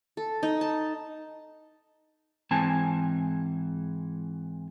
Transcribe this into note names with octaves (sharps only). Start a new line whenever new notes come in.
A4
D#4
A5
G#2 E3 C4 G#5 A5